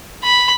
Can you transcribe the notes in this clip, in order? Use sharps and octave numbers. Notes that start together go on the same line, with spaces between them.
B5